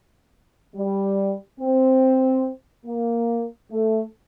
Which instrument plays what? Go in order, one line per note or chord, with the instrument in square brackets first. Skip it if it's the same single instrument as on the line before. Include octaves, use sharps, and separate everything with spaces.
[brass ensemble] G3
C4
A#3
A3